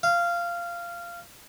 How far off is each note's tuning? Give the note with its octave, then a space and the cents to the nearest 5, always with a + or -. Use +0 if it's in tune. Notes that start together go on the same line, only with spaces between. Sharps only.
F5 -15